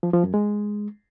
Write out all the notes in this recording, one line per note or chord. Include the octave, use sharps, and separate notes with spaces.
F3
F3
F#2
G#3